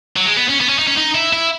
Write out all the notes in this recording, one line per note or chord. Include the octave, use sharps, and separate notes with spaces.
F#3
G#3
B3
C#4
B3
C#4
D#4
C#4
D#4
E4
E4